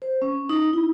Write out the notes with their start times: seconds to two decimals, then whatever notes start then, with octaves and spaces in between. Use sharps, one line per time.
0.02 C5
0.22 C#4
0.49 D#4
0.73 E4